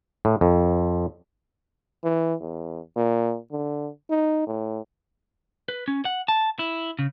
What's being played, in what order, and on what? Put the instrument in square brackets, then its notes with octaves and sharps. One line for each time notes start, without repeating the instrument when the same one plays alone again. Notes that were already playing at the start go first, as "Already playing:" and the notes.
[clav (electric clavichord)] A2
F2
[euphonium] E3
E2
A#2
D3
D#4
A2
[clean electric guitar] B4
C#4
F#5
A5
E4
C#3